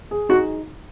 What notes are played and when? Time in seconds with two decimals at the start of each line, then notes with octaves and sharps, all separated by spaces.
0.11 G#4
0.29 D#4 F#4